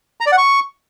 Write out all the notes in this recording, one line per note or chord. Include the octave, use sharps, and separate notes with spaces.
A#5
D5
F#5
C#6